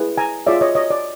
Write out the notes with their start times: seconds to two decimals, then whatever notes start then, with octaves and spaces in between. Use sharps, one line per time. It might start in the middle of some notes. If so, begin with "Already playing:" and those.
Already playing: E4 G#4 B4
0.18 G#5 A#5
0.47 F4 G#4 C#5 D5 E5
0.61 C#5 D#5
0.75 C#5 D#5
0.90 D5